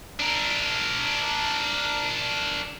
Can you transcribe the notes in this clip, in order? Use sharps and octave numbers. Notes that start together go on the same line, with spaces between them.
D4 A#4